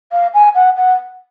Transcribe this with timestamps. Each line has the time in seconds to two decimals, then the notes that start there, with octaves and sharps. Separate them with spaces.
0.12 F5
0.34 G#5
0.55 F#5
0.77 F#5